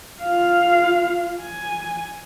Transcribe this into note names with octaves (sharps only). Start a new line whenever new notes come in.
F4 F5
G#5